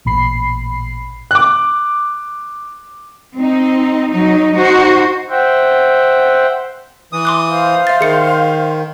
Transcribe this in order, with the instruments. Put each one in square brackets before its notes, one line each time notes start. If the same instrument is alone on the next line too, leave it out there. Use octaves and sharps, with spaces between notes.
[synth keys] A1 A#2 B5 C7
[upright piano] D6 F#6
[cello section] C4 D#4
F#3 D#4
D#4 F#4 C5
[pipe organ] C5 E5 F#5 G5
[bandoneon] E3 D#6
[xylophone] C6 D6 F#6
[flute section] C5 F5
[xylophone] E5 A6
[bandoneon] D#3 [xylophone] G#4 C#7